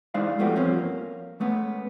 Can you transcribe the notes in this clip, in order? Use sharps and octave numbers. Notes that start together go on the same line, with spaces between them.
G#3 D#4 E4 C5 D5 F5
F3 G3 A3 B3 F#4 G4
G2 F3 C4 C#4
A#3
G#3 A3 B3 C#4